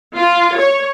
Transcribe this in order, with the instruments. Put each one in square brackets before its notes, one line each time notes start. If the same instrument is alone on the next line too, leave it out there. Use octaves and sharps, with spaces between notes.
[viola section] F4
C#5